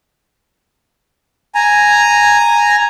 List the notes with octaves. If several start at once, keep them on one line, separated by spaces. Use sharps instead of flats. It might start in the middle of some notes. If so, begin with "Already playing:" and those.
G#5 A#5